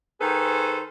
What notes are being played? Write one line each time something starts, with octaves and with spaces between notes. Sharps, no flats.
D#3 G#4 A4 B4 C5